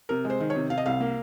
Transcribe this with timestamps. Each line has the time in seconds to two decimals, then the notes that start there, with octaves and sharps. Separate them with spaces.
0.09 C3 A#4
0.25 G#3
0.30 C5
0.40 D#3
0.50 C#5
0.55 C3
0.70 C3 F5
0.78 D#5
0.86 C2 F5
1.00 A#3